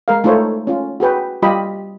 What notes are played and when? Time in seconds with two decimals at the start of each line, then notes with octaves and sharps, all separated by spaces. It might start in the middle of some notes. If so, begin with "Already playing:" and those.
0.08 G#3 A#4 F5
0.24 A3 D#4 F4 A4 C5 C#5
0.67 C#4 F4
1.00 F#4 G#4 B4 G5
1.42 G3 F4 G4 D#5 B5